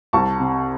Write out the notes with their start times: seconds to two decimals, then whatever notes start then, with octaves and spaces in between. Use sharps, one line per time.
0.13 C2 A5 C#6
0.39 C3